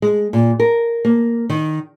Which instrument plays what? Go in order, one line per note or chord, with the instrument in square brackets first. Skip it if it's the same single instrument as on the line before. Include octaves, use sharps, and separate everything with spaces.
[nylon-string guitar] G#3
A#2
A#4
A#3
D#3